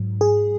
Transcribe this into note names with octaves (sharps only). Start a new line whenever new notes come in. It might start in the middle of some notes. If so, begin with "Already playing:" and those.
Already playing: G#2 F#3
G#4